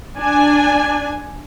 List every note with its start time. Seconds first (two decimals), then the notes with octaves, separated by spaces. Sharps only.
0.18 D4 G#5